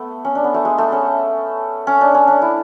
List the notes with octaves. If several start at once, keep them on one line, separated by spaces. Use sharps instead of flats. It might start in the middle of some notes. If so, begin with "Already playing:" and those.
Already playing: A3 B3
C#4
D4
B3
A3
G#3
A3
C#4
C#4
D4
C#4
D4
E4